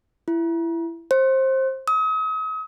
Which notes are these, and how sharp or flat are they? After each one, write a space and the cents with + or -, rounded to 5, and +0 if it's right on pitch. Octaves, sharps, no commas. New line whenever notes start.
E4 +20
C5 +20
D#6 +40